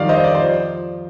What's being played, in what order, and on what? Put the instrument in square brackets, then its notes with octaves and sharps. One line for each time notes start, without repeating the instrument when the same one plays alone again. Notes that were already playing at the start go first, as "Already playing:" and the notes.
Already playing: [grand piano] F2 D#3 G3 D5 F5
C5 D#5
D5
C5
F3